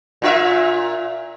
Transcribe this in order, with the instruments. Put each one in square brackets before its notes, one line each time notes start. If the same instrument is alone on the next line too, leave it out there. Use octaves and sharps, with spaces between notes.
[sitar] A#2 F4 E5